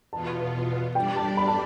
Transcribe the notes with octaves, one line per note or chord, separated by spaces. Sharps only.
E2 B2 B3 F4 A5
G3 D4 G4 D5 G5
A5
B5
A5